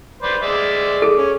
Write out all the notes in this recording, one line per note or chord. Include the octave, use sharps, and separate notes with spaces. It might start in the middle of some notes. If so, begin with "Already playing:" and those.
B4 C5 D5
G#3 D5 E5
G#4 A4
C#4